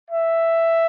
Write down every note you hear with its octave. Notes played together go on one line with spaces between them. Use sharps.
E5